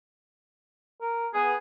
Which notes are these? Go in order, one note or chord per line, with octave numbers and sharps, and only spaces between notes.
A#4
B3 G#4 G#5